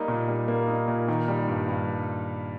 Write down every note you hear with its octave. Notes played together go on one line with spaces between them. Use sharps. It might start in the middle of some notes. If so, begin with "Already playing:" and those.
Already playing: G3 A#3 D#4
A#2
G3
A#3
D#4
A#2
D#3
G3
G2
G2